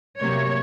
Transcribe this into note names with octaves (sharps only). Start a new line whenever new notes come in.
C3 F#3 A#3 C#5